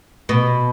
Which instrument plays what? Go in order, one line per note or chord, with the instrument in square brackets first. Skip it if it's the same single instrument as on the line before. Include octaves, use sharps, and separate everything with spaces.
[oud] B2